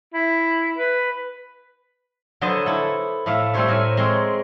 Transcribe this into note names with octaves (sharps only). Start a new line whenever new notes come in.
E4
B4
D3 F#3 B4 C5 D#5 A5
E4 A4
A2 A3 E5 F5
G3 A3 C4 C5 C#5 E5
A2 A#4 E5 G#5
G#3 C4 A#4 C#5